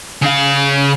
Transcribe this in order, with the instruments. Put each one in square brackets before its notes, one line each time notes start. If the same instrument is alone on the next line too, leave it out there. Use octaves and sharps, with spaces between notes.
[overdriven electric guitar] C#3 F5